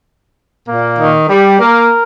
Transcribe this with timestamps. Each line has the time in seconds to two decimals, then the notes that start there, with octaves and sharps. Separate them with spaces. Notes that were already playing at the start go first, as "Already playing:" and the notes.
0.68 A#2 A#3
0.99 D#3 D#4
1.30 G3 G4
1.60 A#3 A#4